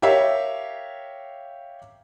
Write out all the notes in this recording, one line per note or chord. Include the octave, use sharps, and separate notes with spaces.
G4 A#4 C#5 E5 F5